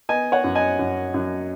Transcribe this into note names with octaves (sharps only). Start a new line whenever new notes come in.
B3 D#5 G#5
C#5 F#5
F#2
D#5 G#5
F#2
F#2